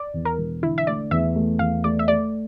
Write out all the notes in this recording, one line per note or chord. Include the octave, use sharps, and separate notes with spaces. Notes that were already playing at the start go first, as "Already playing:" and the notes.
Already playing: D5
E2
A#4
E1
D3 E4
E5
A3 D5
E2 E5
A3
E2 F5
A3 D5
E5
A3 D5